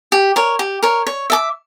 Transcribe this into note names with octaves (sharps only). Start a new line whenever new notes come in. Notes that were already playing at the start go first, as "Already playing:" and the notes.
G4
A#4 C#5
G4
A#4 C#5
C#5
E5 A5 D6